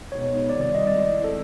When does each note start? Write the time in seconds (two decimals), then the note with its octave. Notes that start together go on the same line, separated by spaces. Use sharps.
0.11 B2 G#3 B3 D#4 C#5
0.49 C3 D#3 G3 C4 F4 D5
0.61 D5
0.75 D#5
0.87 D#3 G#3 C4 E4 D5
1.24 A4